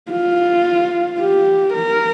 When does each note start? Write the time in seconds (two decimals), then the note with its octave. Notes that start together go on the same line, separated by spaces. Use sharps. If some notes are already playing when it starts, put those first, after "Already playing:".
0.12 F4
1.19 G4
1.73 A#4